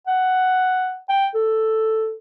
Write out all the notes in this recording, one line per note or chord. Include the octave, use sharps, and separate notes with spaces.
F#5
G5
A4